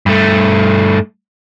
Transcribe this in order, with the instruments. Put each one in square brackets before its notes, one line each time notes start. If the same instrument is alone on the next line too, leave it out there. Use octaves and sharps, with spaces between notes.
[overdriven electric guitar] G2 A3